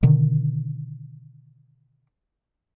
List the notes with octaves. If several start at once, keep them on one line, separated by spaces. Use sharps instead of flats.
B2 D3 D#3